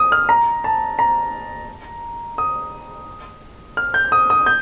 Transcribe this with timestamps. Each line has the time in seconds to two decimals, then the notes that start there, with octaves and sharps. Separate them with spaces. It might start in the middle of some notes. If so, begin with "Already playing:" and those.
Already playing: D#6
0.12 F6
0.29 A#5
0.64 A5
0.99 A#5
2.38 D#6
3.77 F6
3.94 G6
4.12 D#6
4.30 D#6
4.46 G6